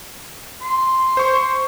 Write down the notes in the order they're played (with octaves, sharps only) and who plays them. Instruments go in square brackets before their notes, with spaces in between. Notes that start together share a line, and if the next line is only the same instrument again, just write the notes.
[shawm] C6
[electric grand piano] C5 C#6